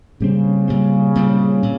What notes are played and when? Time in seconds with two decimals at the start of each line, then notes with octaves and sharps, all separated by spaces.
0.20 A#2 C#3 G3 C4
0.68 A#2 G3 C4
1.15 A#2 G3 C4
1.63 A#2